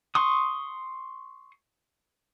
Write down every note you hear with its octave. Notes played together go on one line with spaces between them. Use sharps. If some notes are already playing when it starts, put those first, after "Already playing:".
C6 C#6 D#6